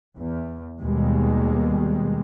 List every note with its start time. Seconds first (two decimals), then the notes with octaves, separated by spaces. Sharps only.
0.16 E2
0.80 D#2 B2 G3 G#3